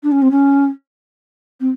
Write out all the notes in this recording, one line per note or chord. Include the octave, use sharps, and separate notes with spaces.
D4
C#4
C4
C#4
C4